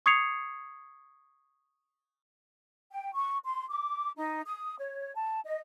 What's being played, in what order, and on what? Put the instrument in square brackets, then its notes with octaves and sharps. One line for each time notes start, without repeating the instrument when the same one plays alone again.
[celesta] C#6 D#6 G#6 C7 C#7 F7
[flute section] G5
C#6
C6
D6
D#4
D#6
C#5
A5
D#5